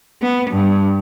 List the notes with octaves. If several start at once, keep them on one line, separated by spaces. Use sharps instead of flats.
B3
G2